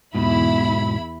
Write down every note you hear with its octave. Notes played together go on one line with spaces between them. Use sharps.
E2 G#2 B2 E4 B5